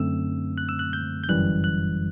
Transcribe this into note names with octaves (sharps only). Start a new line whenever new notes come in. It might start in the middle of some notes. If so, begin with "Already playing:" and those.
Already playing: F#2 D3 A3 C4 E6
F#6
E6
F#6
G6
G6
G1 F#2 E3 G3 F#6
F#6